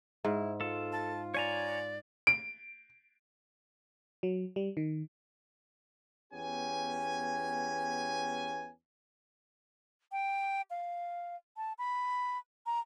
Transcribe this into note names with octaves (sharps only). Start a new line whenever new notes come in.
G#2 E4
F4 A4
A5
C#5 D5 G#5 A#5
D7
F#3
G3
D#3
E2 B3 C#4 G4 G#5
G5
F5
A5
B5
A#5